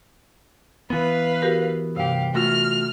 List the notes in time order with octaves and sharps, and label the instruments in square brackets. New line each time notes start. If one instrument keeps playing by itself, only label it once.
[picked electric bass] E3 B3 [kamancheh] B4 F5
[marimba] F#4 G4 A#4
[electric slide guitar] G2 G4 [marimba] C3 [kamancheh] F5
[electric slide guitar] A3 F4 F#4 [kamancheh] F6